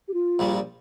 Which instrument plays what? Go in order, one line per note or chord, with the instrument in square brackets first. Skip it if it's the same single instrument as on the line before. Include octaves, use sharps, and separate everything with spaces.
[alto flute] G4
F4
[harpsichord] A#1 A#2 G3